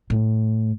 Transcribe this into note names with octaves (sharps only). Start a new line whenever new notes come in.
A2